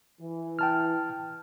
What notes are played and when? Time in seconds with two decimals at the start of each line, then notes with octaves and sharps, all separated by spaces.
0.21 E3
0.59 G5 A5 F6